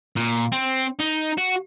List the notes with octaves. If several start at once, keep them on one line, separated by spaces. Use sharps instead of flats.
A#2
C4
D#4
F#4